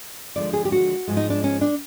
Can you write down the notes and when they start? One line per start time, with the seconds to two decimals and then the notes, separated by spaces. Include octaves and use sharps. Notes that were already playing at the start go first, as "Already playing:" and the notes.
0.35 D#2 D3 F3 G#3 D5
0.53 G#4
0.65 G4
0.72 F#4
1.08 G#2 F3 G#3
1.17 D#4
1.30 D4
1.44 C#4
1.61 D4